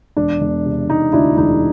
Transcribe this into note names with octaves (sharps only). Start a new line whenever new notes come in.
E1 D4
E1
C3
E1 D#4
D2 D4 E4
E1 D#4